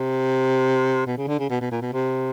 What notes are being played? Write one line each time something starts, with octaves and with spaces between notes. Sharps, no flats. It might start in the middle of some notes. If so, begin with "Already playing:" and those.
Already playing: C3
B2
C#3
D3
C#3
B2
B2
A#2
B2
C3